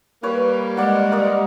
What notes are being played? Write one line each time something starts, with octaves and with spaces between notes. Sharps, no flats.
G3 A#3 B4 C#5
G#3 A#4 D5 F#5
A#4 D5 D#5